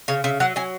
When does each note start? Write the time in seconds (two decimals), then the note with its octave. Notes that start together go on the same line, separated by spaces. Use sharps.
0.08 C#3 C#5
0.24 C#3 E5
0.40 F#3 F#5
0.56 F#3 G#5